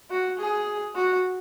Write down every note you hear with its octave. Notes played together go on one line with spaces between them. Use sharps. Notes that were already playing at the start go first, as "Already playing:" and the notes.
F#4
G#4
F#4